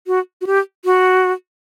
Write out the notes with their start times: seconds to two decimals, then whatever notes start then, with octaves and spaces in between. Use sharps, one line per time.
0.07 F#4
0.41 F#4
0.47 G4
0.85 F#4